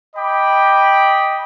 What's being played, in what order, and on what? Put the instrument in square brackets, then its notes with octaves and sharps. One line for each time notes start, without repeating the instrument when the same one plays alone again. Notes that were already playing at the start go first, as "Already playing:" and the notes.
[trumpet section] D#5 G5 B5 D6